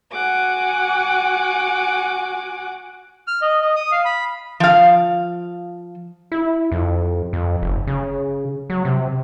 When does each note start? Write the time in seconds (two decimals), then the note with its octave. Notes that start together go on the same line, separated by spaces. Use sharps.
0.11 F#4 F#5 G#5 D6
3.27 F6
3.42 D#5
3.62 D#5
3.76 D#6
3.92 F5
4.05 B5
4.60 F3 F5
6.32 E4
6.72 F2
7.33 F2
7.62 F#1
7.87 C#3
8.70 F#3
8.85 C3